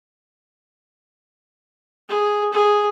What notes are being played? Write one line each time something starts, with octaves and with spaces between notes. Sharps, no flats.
G#4
G#4